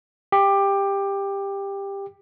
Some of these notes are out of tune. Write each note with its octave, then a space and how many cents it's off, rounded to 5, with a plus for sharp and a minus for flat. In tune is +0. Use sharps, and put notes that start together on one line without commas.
G4 +15